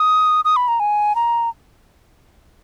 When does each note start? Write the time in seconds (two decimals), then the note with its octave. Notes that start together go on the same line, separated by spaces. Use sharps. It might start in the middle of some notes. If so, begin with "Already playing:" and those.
Already playing: D#6
0.45 D#6
0.56 B5
0.68 A#5
0.80 G#5
1.15 A#5